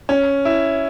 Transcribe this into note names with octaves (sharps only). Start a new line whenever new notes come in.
C#4
E4